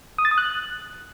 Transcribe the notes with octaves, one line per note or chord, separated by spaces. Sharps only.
D#6
A6
D#6
F#6